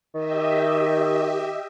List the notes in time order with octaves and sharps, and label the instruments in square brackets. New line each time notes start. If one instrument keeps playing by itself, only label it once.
[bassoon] D#3 [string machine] G4 D#5 E5